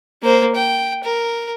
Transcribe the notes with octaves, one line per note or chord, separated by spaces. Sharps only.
A#3 C5
G5
A#4